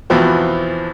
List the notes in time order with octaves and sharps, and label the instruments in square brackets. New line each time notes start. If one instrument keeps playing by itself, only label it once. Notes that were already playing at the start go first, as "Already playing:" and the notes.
[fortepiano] E2 B2 E3 F3 C4